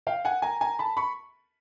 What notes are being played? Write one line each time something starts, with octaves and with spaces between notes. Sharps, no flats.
F5 G5
F#5 G#5
G#5 A#5
G#5 A#5
A5 B5
B5 C#6